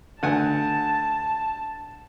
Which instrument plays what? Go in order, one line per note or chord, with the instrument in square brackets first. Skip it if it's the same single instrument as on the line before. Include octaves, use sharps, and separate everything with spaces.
[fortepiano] D2 F#5 G#5 [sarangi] A5